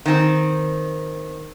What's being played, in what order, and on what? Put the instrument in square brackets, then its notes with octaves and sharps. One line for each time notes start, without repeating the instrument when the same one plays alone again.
[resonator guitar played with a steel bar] D#3 C4